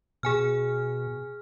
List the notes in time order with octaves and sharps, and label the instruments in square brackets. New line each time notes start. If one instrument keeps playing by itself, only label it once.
[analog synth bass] B2 [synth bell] G#4 G#5 F6